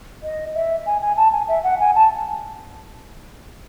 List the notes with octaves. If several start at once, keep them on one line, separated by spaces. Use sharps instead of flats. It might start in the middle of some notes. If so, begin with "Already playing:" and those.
D#5
E5
G#5
G#5
A5
G#5
E5
F#5
G#5
A5